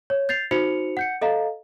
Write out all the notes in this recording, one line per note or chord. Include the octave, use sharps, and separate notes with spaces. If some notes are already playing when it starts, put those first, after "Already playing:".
C#5
G6 A6 C7 F7
D#4 F#4 C5 C#7 F7
F#5 G6 C#7
A4 D#5 F5 A#5